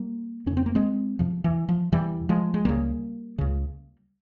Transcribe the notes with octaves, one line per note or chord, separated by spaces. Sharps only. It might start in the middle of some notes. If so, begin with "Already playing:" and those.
Already playing: G3 A#3
F2 C#3 C#4
C4
A#3
G#3 C4
E2 C3 F3
E3
F3
E2 C3 E3 G3
F3 G#3
G#3
C#2 C#3 G3 A#3
C#2 C#3